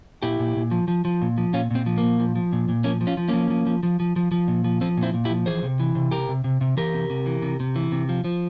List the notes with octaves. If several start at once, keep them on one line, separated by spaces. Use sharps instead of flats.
A#2 E4 G4
A#2
A#2
F3
F3
F3
A#2
F3
A#2 C#4 F4
A#2 C4
F3
A#2 A#3
F3
F3
A#2
A#2
F3 A#3 C#4
F3
C#4 F4
F3
F3 A#3 C#4
F3
F3
F3
F3
F3
F3
A#2
F3
F3 C4
A#2
C4 E4
A#2
E4 G4
F3
E3 G#4 C5
C3
E3
C3
C3 G4 A#4
C3
C3
C3
E3 G4 A#4
C3
C3
E3
C3
C3
E3
C3
F3
F3